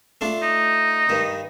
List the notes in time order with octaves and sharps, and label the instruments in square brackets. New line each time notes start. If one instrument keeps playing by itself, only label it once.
[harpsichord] A3 D4 F4
[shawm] D#4
[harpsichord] G2 D#3